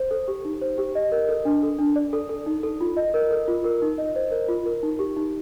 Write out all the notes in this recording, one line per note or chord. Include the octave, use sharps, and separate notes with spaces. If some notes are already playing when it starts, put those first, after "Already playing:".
Already playing: C5
A4
G4
D#4
C5
G4
D#5
A#4
A4
D4
A4
D4
D5
A4
A4
D#4
A4
F4
D#5
A#4
A4
F4
A#4
D#4
D#5
C5
A#4
F4
A#4
D#4
G4
D#4